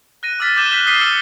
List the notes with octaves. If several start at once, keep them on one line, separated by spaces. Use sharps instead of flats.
F#6 A#6 D#7
D6 E6 F6 A6 B6 D#7
D6 E6 G6 D#7 E7 G7
F#6 B6 F#7
D#6 F6 B6 C7 D#7 G7
E6 F6 C#7